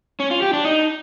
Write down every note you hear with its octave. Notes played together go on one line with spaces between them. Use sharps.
C#4
F4
G4
D4
D#4